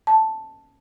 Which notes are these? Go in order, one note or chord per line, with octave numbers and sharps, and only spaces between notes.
A5